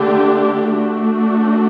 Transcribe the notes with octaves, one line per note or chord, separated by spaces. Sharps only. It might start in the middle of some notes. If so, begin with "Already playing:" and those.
Already playing: D3 A3 D4 G4
A3 D4 F#4